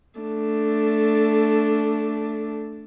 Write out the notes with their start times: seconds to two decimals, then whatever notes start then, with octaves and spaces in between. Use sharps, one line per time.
0.19 A3 D4